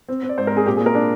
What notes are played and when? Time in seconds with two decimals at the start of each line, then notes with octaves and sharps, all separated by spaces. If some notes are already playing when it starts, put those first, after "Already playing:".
0.09 C4
0.23 C4
0.29 D5
0.37 G#2 C5
0.47 A#4
0.52 C4 G#4
0.66 A#2 G4
0.77 G#4
0.81 A#2
0.86 A#4
0.95 D4